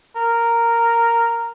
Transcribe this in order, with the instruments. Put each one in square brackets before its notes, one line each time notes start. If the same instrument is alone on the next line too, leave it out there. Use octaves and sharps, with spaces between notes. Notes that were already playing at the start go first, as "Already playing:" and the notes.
[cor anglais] A#4